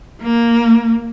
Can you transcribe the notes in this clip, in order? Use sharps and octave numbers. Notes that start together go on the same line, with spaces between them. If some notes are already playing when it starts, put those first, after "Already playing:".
A#3